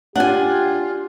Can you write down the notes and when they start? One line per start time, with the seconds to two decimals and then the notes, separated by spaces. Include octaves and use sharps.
0.16 D4 F4 G4 F#5 G#5